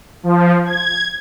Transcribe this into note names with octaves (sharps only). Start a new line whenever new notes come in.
F3
G#6